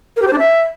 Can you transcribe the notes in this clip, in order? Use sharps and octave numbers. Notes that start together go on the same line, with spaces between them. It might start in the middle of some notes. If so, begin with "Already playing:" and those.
A#4
G4
C5
D4
E5